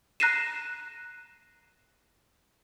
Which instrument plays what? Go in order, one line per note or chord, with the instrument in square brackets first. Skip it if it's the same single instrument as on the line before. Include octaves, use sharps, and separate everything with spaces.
[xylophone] A#5 F#6 A#6 C7 D#7 E7